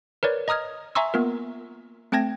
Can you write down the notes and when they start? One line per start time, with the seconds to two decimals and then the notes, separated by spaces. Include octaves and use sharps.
0.23 A#4 B4 C#5 D5
0.48 D#5 A#5 D#6 F6 G#6
0.95 E5 G#5 A#5 C6 C#6 E6
1.14 A#3 B3 F4 A#4
2.12 A3 C4 G5 A5 G#6 A#6